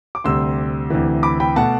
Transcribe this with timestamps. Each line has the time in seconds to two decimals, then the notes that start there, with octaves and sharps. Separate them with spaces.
0.15 D6
0.24 D2 C3 G3 C6 E6
0.90 D2 C3 E3
1.23 B5 D6
1.40 G5 B5
1.56 B2 A3 F#5 A5